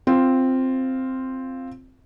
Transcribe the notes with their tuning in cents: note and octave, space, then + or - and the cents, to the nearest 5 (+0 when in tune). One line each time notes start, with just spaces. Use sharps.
C4 +0 F4 +0